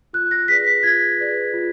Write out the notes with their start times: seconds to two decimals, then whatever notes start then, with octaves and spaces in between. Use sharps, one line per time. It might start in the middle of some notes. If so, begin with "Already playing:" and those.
0.13 F4 F#6
0.31 A#6
0.48 G#4 B4 D5 B6
0.83 F4 G#6
1.18 G#4 B4 D5
1.54 F4